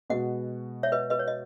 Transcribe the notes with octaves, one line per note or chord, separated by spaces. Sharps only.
B2 G#3 B3 F#4 D#5 F#5
C#5 E5
B4 D#5
B4 D#5
C#5
D#5